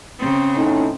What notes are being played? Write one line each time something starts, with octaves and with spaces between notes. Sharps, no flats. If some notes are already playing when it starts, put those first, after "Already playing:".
C#3 C4
A2 C#4 D#4